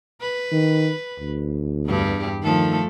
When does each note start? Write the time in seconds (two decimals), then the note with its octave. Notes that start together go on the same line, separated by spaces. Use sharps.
0.21 B4
0.52 D#3
1.19 D2
1.86 E2 G2 G4
2.43 D#3 F3 A3 A4